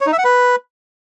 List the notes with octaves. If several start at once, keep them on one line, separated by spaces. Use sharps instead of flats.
C#5
D#4
E5
F#5
B4